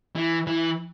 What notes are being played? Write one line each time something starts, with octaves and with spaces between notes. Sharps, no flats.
E3
E3